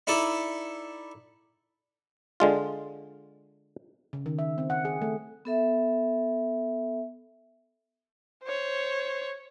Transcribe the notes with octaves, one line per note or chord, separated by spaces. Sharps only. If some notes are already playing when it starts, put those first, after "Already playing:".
D#4 E4 A4 D5
D3 G#3 F4
C#3
D#3
E5
C4
F#5
G#4
A3
B3 A4 E5
C5 C#5